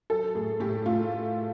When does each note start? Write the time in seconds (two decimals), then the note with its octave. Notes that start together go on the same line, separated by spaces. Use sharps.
0.10 F#3 A4
0.35 A2 G#4
0.60 A2 G4
0.86 A3 F4